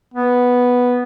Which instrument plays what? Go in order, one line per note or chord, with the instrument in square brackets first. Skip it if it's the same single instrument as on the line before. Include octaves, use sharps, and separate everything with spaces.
[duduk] B3